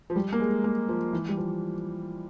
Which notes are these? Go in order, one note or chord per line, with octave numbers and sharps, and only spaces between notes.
F3
G3
A#3
G#3
A#3
F3
E3
G3
F3